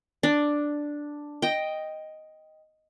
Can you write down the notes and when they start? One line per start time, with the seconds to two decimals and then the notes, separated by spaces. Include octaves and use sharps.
0.23 D4
1.42 D#5 G5